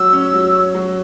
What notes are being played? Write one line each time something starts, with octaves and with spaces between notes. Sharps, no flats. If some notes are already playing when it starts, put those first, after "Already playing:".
Already playing: F#3 E6
C#4
F#3
C#4
F#3